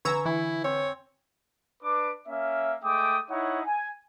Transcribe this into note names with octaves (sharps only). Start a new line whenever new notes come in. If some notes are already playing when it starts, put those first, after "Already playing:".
D3 B4 G#5 A#5 C#6 E6 G#6
E3 E4
C4 C#5
D4 B4 D6
A#3 C#4 E5
G#3 A3 G5 D6 D#6
D#4 E4 C#5 F#5
G#5